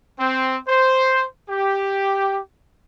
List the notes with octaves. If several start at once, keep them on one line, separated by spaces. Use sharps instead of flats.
C4
C5
G4